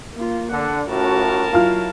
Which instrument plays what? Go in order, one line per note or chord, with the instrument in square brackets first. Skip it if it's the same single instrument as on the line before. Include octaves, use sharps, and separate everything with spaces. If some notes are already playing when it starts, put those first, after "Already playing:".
[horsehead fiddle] A#3 F4
[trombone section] D3 [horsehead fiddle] F#5
[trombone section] A2 A3 F4 [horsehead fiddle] C#4 F#4 [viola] A#4 A5
[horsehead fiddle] F#3 E4 [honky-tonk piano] F4 F6